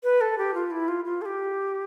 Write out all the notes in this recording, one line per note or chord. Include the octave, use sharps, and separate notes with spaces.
B4
A4
G4
F4
E4
F4
F4
A4
G4